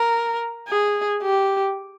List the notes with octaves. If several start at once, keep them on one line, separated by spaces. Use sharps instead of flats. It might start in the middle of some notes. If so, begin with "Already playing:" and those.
Already playing: A#4
G#4
G4